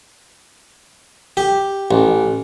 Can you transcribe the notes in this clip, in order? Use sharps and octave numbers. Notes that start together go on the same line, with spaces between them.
G4
A1